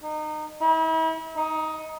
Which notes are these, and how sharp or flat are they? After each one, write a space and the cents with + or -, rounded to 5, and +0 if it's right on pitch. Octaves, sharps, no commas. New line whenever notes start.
D#4 -25
E4 -40
D#4 +15